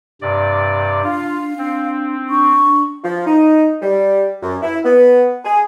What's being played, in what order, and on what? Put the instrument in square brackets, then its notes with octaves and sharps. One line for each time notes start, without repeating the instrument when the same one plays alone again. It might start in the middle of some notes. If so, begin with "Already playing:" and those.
[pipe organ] G2 C3 D5
[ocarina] D4 [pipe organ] F4 [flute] F5
[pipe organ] C4 [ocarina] D4
[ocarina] D4 [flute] C#6
[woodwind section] F3
D#4
G3
F#2
E4
B3
G#4